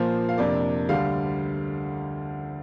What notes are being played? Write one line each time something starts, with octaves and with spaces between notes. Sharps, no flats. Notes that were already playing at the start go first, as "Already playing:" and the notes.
Already playing: A#2 F3 A#3 C5
F5
F2 C3 A#3 D4 D5
D2 D3 G3 F5